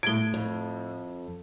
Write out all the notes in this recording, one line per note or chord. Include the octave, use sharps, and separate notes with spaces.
A2 G#6 D7 G7
F2